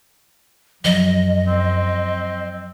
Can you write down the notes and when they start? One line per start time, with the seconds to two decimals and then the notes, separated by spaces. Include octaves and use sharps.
0.85 F#2 F3 F#3 D#5
1.47 C4